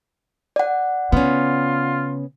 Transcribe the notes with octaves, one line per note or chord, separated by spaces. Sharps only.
D5 F#5
C#3 B3 C#4 F4